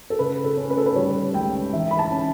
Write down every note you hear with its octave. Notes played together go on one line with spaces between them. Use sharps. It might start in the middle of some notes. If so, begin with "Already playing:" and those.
A4
C#3 B4
A4
C#4
B4
A4
B4
G3 C#5
C#2 G5
E3 E5
B5
A5
C#4